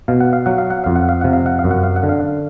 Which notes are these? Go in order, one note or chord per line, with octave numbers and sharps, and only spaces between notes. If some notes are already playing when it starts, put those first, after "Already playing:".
B2 F5
F#5
F5
F#3 F#5
F5
F#5
F2 F5
F#5
F5
C3 F#5
F5
F#5
F5
F#2
F#5
F5
F#5
D3
F5